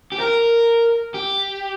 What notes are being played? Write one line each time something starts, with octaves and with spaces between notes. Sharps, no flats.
G4
A#4
G4